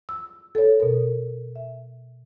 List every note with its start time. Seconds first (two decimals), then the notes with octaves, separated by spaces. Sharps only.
0.09 E6
0.55 A4 C#5
0.80 B2 A#4
1.56 E5